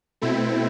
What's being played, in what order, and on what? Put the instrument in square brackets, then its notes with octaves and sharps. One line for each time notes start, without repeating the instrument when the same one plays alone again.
[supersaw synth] B2 A3 C4 E4